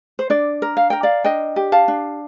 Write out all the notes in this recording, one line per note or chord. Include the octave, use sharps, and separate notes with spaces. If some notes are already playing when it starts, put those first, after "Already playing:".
C5
D4 D5
A#4
F5
A#4 G5
D5 F5
D4 D#5 G5
G4
F5 A5
D4